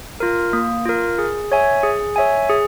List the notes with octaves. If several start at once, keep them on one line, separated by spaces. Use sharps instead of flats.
F4 A#4
A#3
F4 A#4
G#4
C#5 E5 G#5
G#4
C#5 E5 G#5
G#4